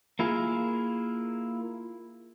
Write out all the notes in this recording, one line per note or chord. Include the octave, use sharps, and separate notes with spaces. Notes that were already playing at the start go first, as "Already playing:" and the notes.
A#3 E4 F4 G#4